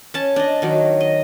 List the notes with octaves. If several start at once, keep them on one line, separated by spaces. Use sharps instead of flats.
C#4 A5
D4 D#5
D#3 F#3
D#5